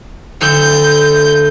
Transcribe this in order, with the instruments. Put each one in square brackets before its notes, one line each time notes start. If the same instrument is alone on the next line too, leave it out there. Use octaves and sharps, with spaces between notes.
[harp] D2 E6 [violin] G6